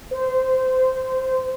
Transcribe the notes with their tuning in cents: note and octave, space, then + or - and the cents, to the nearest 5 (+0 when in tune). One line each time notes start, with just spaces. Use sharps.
C5 -20